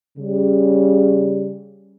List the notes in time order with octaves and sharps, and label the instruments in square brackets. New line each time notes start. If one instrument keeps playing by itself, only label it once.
[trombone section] C#3 G3